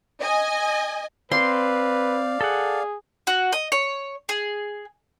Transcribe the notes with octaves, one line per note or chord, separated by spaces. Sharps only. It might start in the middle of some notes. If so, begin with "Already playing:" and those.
D#5 G#5
C4 B4 D5 F5 C6
G#4 A4 F#5
F#4
D#5
C#5
G#4